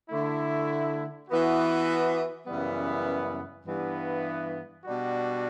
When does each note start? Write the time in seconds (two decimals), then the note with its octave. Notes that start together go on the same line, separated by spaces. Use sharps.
0.10 D3 A3 E4
1.29 E3 B3 F#4
2.47 F#2 C#3 E3 G3 B3
3.66 G2 E3 B3
4.84 B2 G3 D4 F#4